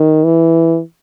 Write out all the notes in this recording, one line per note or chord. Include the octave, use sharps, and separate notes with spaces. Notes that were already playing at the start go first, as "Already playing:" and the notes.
Already playing: D#3
E3